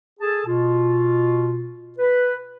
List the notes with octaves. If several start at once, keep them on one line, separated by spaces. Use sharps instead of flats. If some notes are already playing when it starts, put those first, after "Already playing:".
G#4 A4 A5
B2 F4
B4